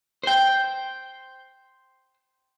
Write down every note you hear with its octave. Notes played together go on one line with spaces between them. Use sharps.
C5 G5